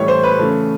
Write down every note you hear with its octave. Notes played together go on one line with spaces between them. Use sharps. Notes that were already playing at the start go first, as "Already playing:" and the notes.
Already playing: A2 E3 G3 C#5
C5
B4
C#3 E3 A3